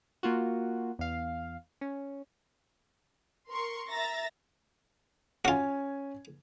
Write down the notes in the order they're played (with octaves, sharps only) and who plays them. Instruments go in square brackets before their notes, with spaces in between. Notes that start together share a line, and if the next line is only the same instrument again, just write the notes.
[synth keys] A#3 F4 F#4
E2 F5
C#4
[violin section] A#4 C6 C#6
E5 A#5 A6 A#6
[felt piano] C#4 G#5 [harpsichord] F4 F#4